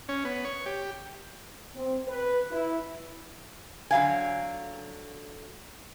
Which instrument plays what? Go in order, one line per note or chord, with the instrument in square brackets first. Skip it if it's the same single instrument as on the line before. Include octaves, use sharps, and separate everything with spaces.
[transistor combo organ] C#4
B3
C#5
G4
[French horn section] C4
B4
E4
[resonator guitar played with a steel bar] D3 F#3 F5 G#5